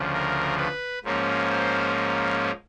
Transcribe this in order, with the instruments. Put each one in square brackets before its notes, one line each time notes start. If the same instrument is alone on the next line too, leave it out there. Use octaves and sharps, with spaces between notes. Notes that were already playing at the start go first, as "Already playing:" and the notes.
Already playing: [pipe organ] D2 C#3 F3
A#4
B4
G#2 F3 A#3 C#4
C5